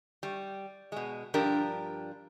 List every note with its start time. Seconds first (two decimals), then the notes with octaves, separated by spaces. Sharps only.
0.23 G3
0.92 B2 G#3
1.34 G2 F3 D4 G4 A#4